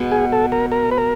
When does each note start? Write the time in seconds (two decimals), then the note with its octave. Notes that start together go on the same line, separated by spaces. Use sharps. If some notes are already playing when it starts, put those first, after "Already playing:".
Already playing: B2 G#3 B3
0.11 G#4
0.32 A4
0.52 A#4
0.72 A#4
0.91 B4
0.98 A#4